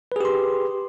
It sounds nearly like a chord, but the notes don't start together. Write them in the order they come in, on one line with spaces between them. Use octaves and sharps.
B4 G#4 G4 C6